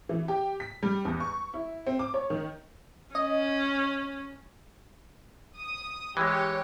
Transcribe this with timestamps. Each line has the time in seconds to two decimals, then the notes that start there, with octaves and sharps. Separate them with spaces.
0.09 E3
0.28 G4
0.60 B6
0.83 G3
1.05 E2
1.20 C#6
1.54 E4
1.87 C4
1.99 D6
2.14 C#5
2.30 D#3
3.15 C#4 D#5
5.58 D#6
6.17 E3 G#3 G4 C#5